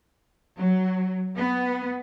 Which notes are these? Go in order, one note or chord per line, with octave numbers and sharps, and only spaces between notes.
F#3
B3